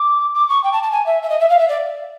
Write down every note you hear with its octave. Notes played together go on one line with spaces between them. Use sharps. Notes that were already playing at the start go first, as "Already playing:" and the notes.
Already playing: D6
D6
C#6
G5
A5
A5
G#5
E5
E5
D#5
E5
F5
E5
D5